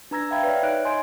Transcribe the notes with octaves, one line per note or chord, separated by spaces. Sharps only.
D4 B4 A#5 E6 G#6 A#6
E5 F5 G5 B5 G#6
B4 C#5 D5 E5
D#4 C#5 F#6 D7
D#5 G#5 C6 G6 G#6 D7